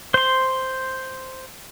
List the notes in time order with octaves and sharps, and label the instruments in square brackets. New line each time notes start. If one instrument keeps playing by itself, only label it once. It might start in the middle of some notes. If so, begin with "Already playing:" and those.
[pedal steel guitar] C5 C6